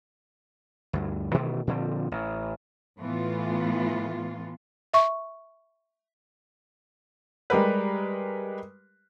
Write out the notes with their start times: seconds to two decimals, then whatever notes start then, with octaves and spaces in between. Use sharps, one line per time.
0.93 D2 G2
1.34 B2 D#3 E3 A3
1.67 A#2 D3 F3 C4
2.12 A1
2.99 A2 E3 B3 F4
4.94 E5 C#6
7.50 G3 G#3 G4 A#4 B4